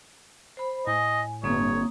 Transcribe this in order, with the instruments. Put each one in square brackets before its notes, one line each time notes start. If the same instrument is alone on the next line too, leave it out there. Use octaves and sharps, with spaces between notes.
[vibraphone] C5 B5
[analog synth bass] A2 [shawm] D#5 [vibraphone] G#5
[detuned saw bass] G1 [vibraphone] A#3 C4 D#6 [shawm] C#5